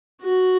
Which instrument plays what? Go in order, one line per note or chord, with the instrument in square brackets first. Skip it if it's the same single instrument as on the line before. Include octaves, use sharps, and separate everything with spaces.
[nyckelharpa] F#4